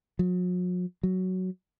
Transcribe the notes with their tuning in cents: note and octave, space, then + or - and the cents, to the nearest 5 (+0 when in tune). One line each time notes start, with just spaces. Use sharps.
F#3 -45
F#3 +5